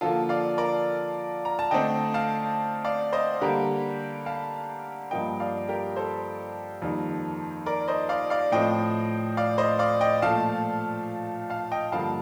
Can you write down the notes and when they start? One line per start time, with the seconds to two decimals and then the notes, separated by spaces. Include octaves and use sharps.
0.01 D3 F3 A#3 F4 A4
0.29 D5 F5
0.58 A#4 D5
1.45 A#5
1.59 A5
1.71 D3 A3 C4 D#5 G5
2.14 F5 A5
2.84 D5 F5
3.13 C5 D#5
3.41 D3 G3 A#3 G4 A#4
4.26 F5 A5
5.11 G2 F3 A#3 D#5 G5
5.40 D5 F5
5.69 G4 A#4
5.96 A4 C5
6.82 F2 D#3 G3 A#3
7.66 A#4 D5
7.88 C5 D#5
8.09 D5 F5
8.30 D5 F5
8.52 A2 F3 C4 D#5 G5
9.37 D5 F5
9.58 C5 D#5
9.79 D5 F5
10.01 D#5 G5
10.22 A#2 F3 A3 F5 A5
11.50 F5 A5
11.71 D#5 G5
11.92 G2 D3 F3 A#3 F5 A5